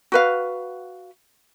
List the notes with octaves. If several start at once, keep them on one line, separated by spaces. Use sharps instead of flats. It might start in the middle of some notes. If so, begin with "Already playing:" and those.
F#4 B4 F5